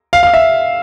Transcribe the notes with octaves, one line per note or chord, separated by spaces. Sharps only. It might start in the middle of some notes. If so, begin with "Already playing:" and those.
F5
F5
E5